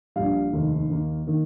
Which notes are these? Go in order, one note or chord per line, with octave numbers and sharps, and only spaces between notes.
A#1 A#2 G3 F5
F1 D#2 D#3 A#3
D#2 D#3 A#3
D#3 A#3